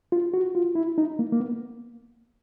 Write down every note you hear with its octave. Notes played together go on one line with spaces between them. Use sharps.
F4
F#4
F4
E4
D#4
A#3
A#3
B3